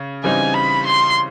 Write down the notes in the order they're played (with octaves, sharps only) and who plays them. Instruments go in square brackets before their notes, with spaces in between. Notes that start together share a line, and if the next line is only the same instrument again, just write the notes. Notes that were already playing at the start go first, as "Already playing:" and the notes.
Already playing: [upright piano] C#3
[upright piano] C#3 E3 G3 C4 D#4 [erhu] G#5
[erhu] B5
C6